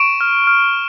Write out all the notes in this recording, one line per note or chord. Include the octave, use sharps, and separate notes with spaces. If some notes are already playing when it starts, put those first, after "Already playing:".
Already playing: C#6 D7 E7
F6
F6